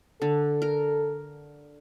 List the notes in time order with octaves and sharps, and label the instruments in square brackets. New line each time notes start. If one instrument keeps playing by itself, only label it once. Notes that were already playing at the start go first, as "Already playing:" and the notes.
[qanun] D3 [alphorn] A4
[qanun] A#4